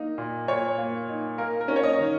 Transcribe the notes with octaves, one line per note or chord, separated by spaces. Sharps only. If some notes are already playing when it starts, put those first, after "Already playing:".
Already playing: A#3 D#4
A#2
A#2 C#5
A#3
D#4
A#3 A#4
A#4
C#4
C#5
D#5
D#3